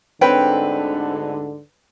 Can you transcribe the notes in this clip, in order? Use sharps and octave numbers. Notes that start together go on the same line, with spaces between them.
D2 G#2 D3 C4 B4 C#5 G5